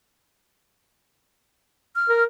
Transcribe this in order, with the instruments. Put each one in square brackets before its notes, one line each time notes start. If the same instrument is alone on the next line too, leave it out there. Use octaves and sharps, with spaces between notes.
[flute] F6
[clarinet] A#4